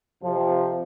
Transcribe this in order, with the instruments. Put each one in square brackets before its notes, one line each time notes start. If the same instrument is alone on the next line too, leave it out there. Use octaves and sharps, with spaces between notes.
[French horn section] F2 C3 F3